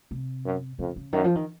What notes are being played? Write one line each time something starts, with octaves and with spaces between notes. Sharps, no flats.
C3
F#2
F2 C#3
C#3
F#2 D#3
F3
D#3